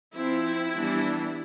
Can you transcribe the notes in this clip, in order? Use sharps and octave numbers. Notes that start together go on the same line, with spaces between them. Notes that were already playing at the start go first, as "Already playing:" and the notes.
F3 C4 E4
E3 G3 B3 D4